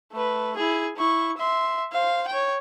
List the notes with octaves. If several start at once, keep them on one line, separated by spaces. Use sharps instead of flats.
A3 B4
E4 G#4
E4 C#6
E5 C6
C5 F5
C#5 G5